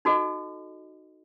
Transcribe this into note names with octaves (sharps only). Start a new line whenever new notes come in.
D#4 F#4 A4 D#5